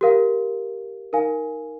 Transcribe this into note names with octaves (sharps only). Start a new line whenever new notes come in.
G4 A#4 F5
D#4 A#4 F5 G#5